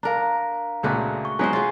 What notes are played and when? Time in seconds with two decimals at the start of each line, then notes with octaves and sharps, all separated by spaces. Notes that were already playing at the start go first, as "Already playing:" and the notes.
0.03 D4 A#4 F5 A#5
0.83 C#2 A#2 G#3 A3 F#4
1.25 C#6
1.39 F#3 G#3 B4 C5 G#5
1.53 F4 G#4